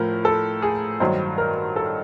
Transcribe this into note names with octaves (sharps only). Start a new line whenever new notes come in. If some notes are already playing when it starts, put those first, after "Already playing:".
Already playing: A2 F3 A3 A#4
A4
G#4
G2 D#3 F#3 C5
A#4
A4